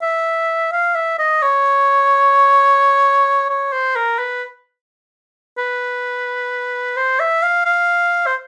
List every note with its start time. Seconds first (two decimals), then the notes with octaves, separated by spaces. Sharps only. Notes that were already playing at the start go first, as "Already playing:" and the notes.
0.02 E5
0.72 F5
0.95 E5
1.18 D#5
1.42 C#5
3.50 C#5
3.72 C5
3.96 A#4
4.19 B4
5.58 B4
6.97 C5
7.20 E5
7.43 F5
7.65 F5
8.26 C5